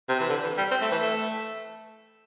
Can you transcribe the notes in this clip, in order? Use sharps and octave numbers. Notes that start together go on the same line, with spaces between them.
C3
E3
D3
E3
G3
C4
A3
E3
A3